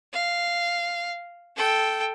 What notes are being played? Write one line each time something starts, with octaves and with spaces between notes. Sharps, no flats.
F5
A4 G5